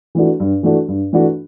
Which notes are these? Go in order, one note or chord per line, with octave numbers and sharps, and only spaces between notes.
E3 A3 D4 F#4
G2
E3 A3 D4 F#4
G2
E3 A3 D4 F#4